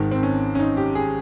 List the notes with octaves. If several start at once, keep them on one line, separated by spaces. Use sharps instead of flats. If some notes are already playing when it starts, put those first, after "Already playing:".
Already playing: G#1 G#2 D#3
C4
C#4
C#4
D#4
G4
G#4